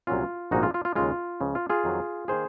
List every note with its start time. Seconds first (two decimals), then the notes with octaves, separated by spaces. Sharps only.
0.07 C2 A#2 F#3 C#4 F4
0.51 A#1 G#2 D#3 A#3 D#4 F#4
0.63 F4
0.74 F4
0.85 F4
0.96 D#2 C#3 G#3 F4
1.40 C#2 C#3 F3
1.55 F4
1.69 F4 G#4
1.84 F2 D#3 F#3
2.28 D#3 A#3 G#4 C5